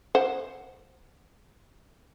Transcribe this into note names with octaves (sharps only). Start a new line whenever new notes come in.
C5 F#5